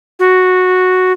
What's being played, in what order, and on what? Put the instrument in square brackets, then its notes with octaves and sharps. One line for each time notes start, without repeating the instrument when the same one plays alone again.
[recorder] F#4